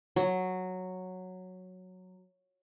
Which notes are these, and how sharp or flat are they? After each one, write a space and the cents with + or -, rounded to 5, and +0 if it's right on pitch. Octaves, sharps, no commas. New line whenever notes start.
F#3 -5